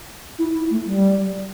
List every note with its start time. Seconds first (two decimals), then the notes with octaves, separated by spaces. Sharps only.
0.39 E4
0.55 E4
0.71 A3
0.86 G3